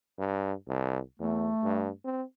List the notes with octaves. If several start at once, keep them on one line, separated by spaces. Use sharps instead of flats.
G2
C2
E2 A3
G2
C4